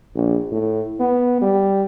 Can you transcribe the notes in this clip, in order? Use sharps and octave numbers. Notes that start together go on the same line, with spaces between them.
A#1
A2
B3
G3